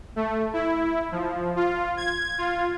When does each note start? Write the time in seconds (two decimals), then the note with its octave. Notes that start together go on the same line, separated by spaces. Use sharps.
0.16 A3
0.53 E4
1.12 F3
1.56 F4
1.97 G#6
2.38 F4